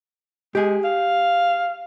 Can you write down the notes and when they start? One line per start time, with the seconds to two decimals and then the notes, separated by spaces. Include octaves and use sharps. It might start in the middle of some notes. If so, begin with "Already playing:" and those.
0.55 G#3 G4 G#4
0.84 F5